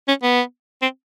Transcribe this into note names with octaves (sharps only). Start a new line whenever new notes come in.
C#4
B3
C4